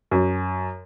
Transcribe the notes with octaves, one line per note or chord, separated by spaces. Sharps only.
F#2